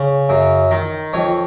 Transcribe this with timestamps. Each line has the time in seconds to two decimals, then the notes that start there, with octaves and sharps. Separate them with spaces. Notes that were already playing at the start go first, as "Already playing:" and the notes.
Already playing: C#3
0.29 F#2
0.71 D#3
1.13 F2 C#5